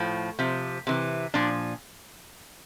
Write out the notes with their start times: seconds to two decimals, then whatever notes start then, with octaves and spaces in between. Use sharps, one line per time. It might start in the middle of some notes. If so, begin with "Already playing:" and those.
Already playing: A2 F3
0.39 C3 F3
0.87 C3 E3
1.34 A#2 F3 D4